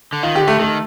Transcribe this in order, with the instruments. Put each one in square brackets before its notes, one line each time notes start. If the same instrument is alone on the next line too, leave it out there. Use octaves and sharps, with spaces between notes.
[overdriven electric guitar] D3
[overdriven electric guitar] D#3 [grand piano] F4
[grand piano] G4
[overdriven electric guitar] D3
[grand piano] A3
[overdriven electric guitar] D#3 [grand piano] A3